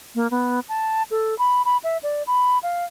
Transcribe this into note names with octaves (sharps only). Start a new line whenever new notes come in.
A#3
B3
A5
A4
B5
B5
E5
D5
B5
F5